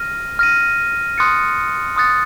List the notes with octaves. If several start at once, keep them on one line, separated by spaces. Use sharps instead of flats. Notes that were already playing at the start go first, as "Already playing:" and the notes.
Already playing: F6 A#6 D#7
F6 A#6 D#7
C6 D#6 F#6 A6 C#7
C6 D#6 F#6 A6 C#7